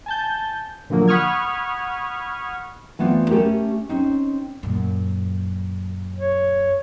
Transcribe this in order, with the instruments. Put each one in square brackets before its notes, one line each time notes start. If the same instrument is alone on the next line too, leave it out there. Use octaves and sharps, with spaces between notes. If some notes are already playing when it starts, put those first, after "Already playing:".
[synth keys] G#5 A5 G6
A#2 D3 F3 F#3 A#3
F#5 B5 C#6 D#6 F6 G#6
[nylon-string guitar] E3 A3 B3 C4 F4 D5
A3 C#4 G4 A#4
C4 C#4 D#4
[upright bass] F#2 A#2
[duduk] C#5